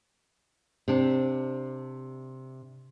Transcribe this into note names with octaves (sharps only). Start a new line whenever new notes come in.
C3 D4